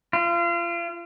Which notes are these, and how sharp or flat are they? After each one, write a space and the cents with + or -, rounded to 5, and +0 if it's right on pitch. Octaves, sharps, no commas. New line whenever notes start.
F4 -35